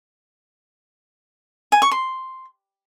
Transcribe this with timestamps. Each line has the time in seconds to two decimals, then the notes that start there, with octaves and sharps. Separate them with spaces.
1.72 G#5
1.82 C#6
1.92 C6